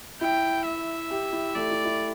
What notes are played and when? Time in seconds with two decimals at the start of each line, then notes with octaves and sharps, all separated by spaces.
0.21 E4 G5
0.66 E5
1.11 G4
1.32 E4
1.55 A3 D5
1.71 E4
1.85 E4